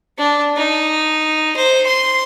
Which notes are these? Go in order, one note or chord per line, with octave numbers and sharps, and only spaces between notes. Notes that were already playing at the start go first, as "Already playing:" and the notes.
D4
D#4
C5
C6